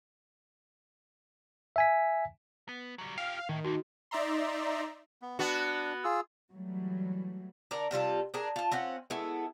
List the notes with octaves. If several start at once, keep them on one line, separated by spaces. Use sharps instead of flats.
E5 G#5 B6
B3
F#3 G3
F4 G4 F5
A2 D#3
D2 A#3 F#4
D#4 D5 E5 A#5 C6
B3
B3 D4 F#4
F4 G#4 E6
E3 F#3 G3 A3
D3 A#4 D5 A#5
C3 G3 F4 A4
D4 G#4 A#4
F4 A5
C4 C#4 F4 F#5
G#3 A3 B3 E4